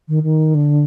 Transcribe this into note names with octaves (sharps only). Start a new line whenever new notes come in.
D#3
D#3
D3